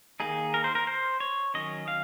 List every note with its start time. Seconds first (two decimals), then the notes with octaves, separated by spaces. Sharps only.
0.20 D#3 A#3 D#4 G#4
0.54 A#4
0.64 C5
0.75 A#4
0.87 C5
1.20 C#5
1.54 D#3 F#3 C#4 D#5
1.88 F5